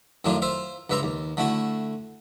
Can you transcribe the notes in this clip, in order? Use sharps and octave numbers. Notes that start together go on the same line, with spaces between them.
F#2 A2 D#3 D4 D#4 F4
F4 C5 E5 F5
C#2 G2 B4 E5 A#5 C6
D#2
D3 A3 E4 F#4 B5